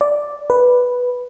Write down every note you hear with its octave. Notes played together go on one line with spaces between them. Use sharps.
D5
B4